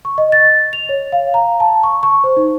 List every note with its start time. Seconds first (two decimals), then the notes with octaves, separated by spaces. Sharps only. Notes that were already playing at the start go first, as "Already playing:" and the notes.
0.05 C#6
0.18 D#5
0.32 A6
0.73 F7
0.89 C#5
1.12 F5
1.34 A#5
1.60 A5
1.83 C#6
2.03 C#6
2.24 C5
2.37 D#4